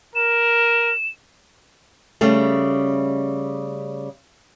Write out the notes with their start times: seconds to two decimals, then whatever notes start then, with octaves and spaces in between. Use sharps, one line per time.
0.15 A#4 E7
2.21 C#3 G3 A3